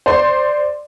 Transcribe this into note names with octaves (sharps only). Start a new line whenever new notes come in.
C5 D5 C6